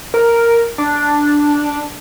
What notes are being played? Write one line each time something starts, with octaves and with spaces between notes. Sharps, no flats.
A#4
D4